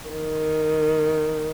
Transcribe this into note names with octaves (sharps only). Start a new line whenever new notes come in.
D#3